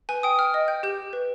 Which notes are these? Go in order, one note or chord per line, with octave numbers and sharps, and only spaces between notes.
B4 G#5
G5 D#6
G5 F6
D#5
G5 G6
G4 G6
G4
B4